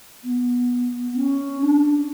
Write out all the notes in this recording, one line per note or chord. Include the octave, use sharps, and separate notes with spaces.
B3
C#4
D4